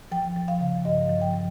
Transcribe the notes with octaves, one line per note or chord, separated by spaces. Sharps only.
F3 G5
F3
F5
C#3
G2 D#5
F3
G5
F3